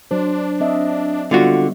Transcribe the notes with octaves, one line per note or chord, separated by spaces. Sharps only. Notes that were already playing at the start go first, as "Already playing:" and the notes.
F#3 D4 C5
C4 D#5 E5
D3 G3 B3 F4 F#4